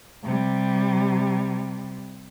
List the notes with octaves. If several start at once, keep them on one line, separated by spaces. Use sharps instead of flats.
C3 G3